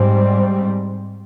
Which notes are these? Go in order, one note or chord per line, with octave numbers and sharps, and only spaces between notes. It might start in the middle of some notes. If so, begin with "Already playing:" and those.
Already playing: G#2 G3 C4